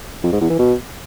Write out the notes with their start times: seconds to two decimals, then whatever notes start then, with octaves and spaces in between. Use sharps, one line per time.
0.23 F2
0.32 G#2
0.41 E2
0.50 E3
0.59 B2